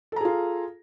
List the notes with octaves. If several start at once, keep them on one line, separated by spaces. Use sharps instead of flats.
F4 G#4 A4 A#5